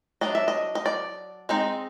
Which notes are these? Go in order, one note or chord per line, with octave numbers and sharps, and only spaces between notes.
F#3 A#3 D4 D#5
E5
D#5
D#5
D5
G#3 C4 D#4